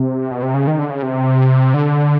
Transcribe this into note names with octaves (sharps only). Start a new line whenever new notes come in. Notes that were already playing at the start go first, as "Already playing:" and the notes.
Already playing: C3
B2
C3
C#3
D#3
D3
C#3
C3
D3